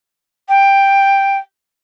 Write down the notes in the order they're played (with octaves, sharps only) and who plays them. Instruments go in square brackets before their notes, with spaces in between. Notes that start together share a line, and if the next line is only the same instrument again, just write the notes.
[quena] G5